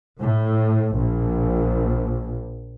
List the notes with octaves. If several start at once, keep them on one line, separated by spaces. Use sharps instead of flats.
A2
A#1